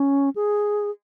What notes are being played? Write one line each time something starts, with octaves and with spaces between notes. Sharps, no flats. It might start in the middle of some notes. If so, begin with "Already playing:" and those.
Already playing: C#4
G#4